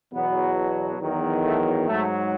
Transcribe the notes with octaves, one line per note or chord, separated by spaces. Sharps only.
E2 B2 F#3 B3
E2 D#3 F#3
A3
G#2 F#3 A3